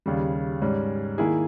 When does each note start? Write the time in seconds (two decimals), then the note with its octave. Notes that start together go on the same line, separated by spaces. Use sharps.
0.06 D#2 C#3 G3
0.62 G#2 G3 C#4
1.18 D#3 A#3 E4 G#4